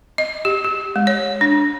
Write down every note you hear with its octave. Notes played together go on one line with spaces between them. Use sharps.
D#5
G4
G4
G#3
C#5
D4